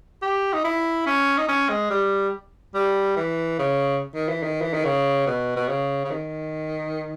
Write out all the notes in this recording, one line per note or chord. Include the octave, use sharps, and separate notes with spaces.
G4
D#4
E4
C#4
D#4
C#4
G#3
G3
G3
E3
C#3
D#3
E3
D#3
E3
D#3
C#3
B2
B2
C#3
C#3
D#3